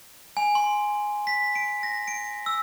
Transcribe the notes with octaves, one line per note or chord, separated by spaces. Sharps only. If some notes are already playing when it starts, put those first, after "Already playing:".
G#5
C6
B6
D7
A#6
D7
E6